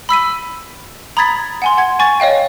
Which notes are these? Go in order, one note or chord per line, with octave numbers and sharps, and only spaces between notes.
B5 E6 B6 D#7
A#5 B5 D#6 G#6 A6 B6
F#5 G#5 C6
F#5 G#6
G#5 C#6 A6
C#5 D#5 F5 G5